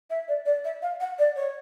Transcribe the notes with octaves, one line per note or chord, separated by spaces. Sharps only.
E5
D5
D5
E5
F5
F#5
D5
C#5